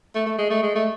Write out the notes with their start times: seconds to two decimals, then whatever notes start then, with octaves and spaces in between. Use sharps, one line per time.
0.15 A3
0.26 A3
0.38 G#3
0.50 A3
0.63 G#3
0.75 A3